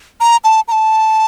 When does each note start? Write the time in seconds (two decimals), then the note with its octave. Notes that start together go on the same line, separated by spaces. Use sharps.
0.20 A#5
0.44 A5
0.68 A#5
0.72 A5